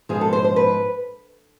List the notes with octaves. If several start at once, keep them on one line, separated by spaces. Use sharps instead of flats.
G#2 F3 B3 G#4
A4
C5
C5
B4